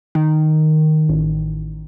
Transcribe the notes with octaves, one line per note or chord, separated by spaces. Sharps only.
D#3
A1